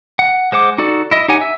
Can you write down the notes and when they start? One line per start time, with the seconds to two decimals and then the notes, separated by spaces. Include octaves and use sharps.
0.19 F#5
0.52 G#3 C5 F#5 D6
0.78 D#4 F#4 A4 D5
1.11 E4 D#5
1.28 D#4 G4 C#5 F#5 G#5
1.41 E5